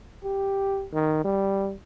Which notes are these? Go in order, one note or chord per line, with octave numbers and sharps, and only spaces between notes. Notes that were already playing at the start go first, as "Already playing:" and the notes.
G4
D#3
G3